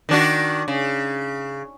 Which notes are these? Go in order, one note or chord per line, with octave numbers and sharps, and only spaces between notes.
D#3 D4 F#4
C#3